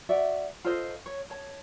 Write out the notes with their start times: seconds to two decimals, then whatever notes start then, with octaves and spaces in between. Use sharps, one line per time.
0.09 F#4 D5 E5
0.65 F4 A4 C5 D#5
1.06 C#5
1.30 C#5 A5